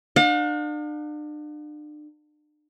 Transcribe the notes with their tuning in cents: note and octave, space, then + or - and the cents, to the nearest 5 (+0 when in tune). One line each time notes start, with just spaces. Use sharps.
D4 +40 F5 +45